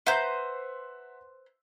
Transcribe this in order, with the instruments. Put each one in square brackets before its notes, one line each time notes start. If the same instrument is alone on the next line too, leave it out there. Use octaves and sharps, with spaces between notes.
[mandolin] B4 C5 G6 [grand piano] E5 F#5 A#5